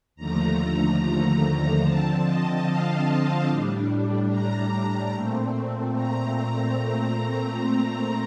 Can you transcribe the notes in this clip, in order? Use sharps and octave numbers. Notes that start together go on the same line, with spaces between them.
D#2 D3 F3 A3 A#5
D3 F3 C4 A5
D#5
F5
A2 G3 D4
A#5
A#2 A3 C4
A#5